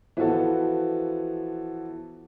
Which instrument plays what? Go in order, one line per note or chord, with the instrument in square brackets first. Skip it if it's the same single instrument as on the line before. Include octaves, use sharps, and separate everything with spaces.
[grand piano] E3 F3 B3 F#4 A4